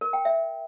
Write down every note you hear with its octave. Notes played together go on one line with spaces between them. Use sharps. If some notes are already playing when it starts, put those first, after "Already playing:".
A#4
G5
E5